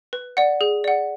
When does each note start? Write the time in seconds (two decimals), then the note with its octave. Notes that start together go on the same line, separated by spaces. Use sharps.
0.13 B4
0.37 D5 F#5
0.61 G#4
0.84 D5 F#5